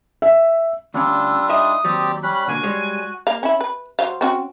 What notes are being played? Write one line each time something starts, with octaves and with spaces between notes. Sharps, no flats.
E5
D2 G3 C#4 D4 F4 E6
D#4 D#5 E5 D#6
D#2 F#3 C4 G4 D5
G3 C#4 B5 F#6
B2 D3 A#3 F#4 G#5
G3 G#3 C#5
A#3 F5
C#4 E4
B4
F#3 C5 F5
C4 C#4 F#4